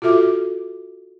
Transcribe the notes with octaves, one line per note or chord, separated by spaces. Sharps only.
F4 F#4 A4 E5 D6